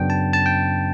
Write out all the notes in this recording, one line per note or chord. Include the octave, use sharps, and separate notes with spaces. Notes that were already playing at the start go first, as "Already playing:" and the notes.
Already playing: F#2 C#3 F#3 B3 D4 G5
A5
A5
G5